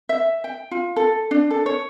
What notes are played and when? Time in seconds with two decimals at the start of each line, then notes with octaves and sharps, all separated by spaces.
0.09 E5
0.44 G5
0.71 F4
0.96 A4
1.31 D4
1.51 A4
1.66 C#5